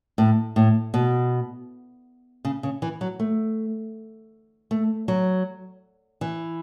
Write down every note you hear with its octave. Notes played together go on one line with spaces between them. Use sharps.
A2
A2
B2
C#3
C#3
E3
F#3
A3
A3
F#3
E3